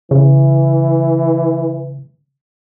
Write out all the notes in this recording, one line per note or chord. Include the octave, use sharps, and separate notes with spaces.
C#3 E3